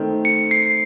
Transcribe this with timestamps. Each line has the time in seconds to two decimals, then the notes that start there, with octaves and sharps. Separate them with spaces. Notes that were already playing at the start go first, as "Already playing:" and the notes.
Already playing: D#3 A3 C4
0.25 C#7
0.51 C7